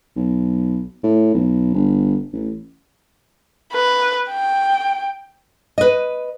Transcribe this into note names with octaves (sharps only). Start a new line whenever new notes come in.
B1
A2
B1
G1
A1
B4
G5
B4 D#5